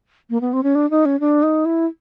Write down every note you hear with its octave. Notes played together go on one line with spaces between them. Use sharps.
A#3
B3
C4
C#4
D4
D#4
C#4
D4
D#4
E4